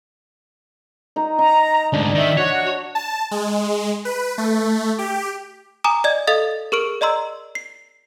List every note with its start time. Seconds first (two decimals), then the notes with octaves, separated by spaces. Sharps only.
1.16 D#4 A#5
1.39 D#4 A#5
1.93 D2 G#2 D4
2.15 D#3 E5
2.37 F#4 C#5
2.95 A5
3.31 G#3
4.05 B4
4.38 A3
4.98 G4
5.84 G#5 A#5 D6 D#6 E7
6.04 D5 D#5 G#6
6.27 A4 D#5 F5 D#6 A6
6.72 G#4 A#4 C#6 F6 D7
7.01 D5 D#5 A#5 C6 E6
7.55 C7